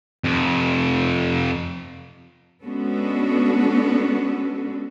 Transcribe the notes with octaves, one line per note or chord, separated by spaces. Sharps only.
F2 C3
G#3 B3 C#4 D4 F#4 A4